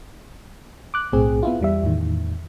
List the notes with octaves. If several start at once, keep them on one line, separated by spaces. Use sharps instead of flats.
D6 F#6
B1 A2 C4 G#4
B3 E4 F4
E2 G3 E5
E2 A2 D#3